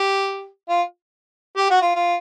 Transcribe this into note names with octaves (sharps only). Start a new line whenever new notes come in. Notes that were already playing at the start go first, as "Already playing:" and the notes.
Already playing: G4
F4
G4
F#4
F4
F4